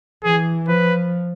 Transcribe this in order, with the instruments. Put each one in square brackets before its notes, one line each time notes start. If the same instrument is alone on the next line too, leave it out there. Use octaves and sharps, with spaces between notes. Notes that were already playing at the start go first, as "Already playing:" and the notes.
[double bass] E3 [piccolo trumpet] G#4
[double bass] F3 [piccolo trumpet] B4